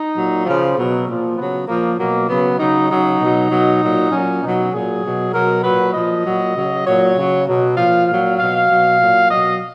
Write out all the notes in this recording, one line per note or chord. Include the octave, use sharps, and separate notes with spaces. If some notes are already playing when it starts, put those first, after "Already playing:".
Already playing: D#4
A#2 F#3
C#3 F3
B2 F#3
A#2 F3
C#3 F#3 B3
A#2 F3 A#3
B2 F#3 A#3
C#3 F#3 B3
C#3 F#3 D#4
C#3 F#3 D#4
B2 F#3
B2 F#3
A#2 F#3
A#2 F#3 C#4
B2 F#3 D#4
A#2 F#3 G#4
B2 F#3
B2 F#3 A#4
A#2 F#3 B4
A#2 F3 D#5
A#2 F#3
C#3 F#3
A#2 F#3 C#5
C#3 F#3
B2 F#3
A#2 F3 F5
A#2 F#3 F5
B2 F#3 F5
B2 F#3
A#2 F#3
B2 F#3 D#5